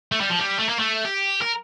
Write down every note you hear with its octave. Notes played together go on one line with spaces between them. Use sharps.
A3
G3
F3
G3
A3
A#3
A3
G4
A#4